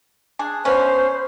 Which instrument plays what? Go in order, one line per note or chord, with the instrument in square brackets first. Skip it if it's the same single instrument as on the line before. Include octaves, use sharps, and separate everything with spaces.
[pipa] D4 G#4
[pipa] B2 B3 C#4 [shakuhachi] C5